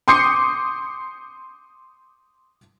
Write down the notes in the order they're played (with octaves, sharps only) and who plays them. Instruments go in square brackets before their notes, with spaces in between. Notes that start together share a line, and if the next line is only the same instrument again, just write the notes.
[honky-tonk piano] C6 D6 D#6 G6 C7 C#7